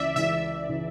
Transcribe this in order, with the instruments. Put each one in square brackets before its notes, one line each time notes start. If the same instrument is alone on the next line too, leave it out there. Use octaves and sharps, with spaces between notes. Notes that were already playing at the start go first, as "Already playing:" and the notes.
Already playing: [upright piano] C#2 C#3 E3 [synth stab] D5 E5
[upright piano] C#2 C#3 E3 [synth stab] E5
[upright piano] C#3 E3